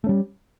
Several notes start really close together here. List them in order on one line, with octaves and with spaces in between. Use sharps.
A3 C#4 G3